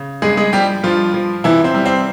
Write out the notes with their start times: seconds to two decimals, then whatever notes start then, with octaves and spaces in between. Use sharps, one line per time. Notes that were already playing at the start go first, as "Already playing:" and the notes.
Already playing: C#3
0.22 G2 G#3 G#4
0.37 G#3 G#4
0.53 F3 G3 G4
0.83 G2 F3 F4
1.14 F3
1.44 C3 E3 E4
1.64 C4
1.75 G3
1.85 C4